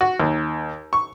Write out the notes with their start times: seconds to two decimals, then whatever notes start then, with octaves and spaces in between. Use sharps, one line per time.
0.01 F#4
0.20 D#2
0.93 C#6